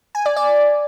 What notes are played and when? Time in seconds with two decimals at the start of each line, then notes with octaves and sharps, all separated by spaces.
0.15 G#5
0.26 D5
0.36 D5